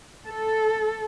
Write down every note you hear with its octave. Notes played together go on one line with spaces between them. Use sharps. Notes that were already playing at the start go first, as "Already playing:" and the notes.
A4